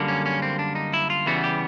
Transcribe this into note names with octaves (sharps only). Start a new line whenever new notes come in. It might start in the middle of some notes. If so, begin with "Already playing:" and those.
Already playing: F#2 D3 G3 A#3
C#4
C#4
C4
D4
D#4
E4
F4
E2 C#3 E3 G3 B3 F#4
G4